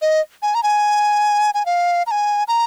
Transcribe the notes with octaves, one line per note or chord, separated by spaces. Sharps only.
D#5
G#5
A#5
G#5
G#5
F5
A#5
G#5
A#5